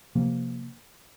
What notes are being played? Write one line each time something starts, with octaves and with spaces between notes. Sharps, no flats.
C3 F3 A#3